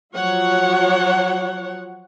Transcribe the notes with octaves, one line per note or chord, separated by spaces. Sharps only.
F3 F#3 F4 C#5 F#5